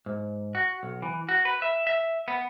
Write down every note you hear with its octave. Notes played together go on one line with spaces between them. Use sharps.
G#2
F#4
B1
E3
F#4
B4
E5
E5
B3